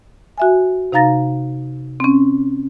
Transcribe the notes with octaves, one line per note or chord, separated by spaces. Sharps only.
F#4 E5 G#5
C3 D#4 F5 A#5 A6 A#6
C4 C#4